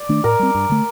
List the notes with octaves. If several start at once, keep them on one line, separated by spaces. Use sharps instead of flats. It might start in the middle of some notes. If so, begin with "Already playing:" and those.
Already playing: D5
D#3 A3 D4
A2 A#4
G3 C4
G2
D3 A3